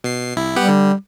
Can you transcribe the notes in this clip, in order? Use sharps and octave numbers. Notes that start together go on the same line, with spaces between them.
B2 C7
C2 E4
G3 B3 G4 F#5
D3